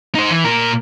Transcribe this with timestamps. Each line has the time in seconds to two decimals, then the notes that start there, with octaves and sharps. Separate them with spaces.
0.15 D#4 C5
0.30 E3
0.44 A#2 A#4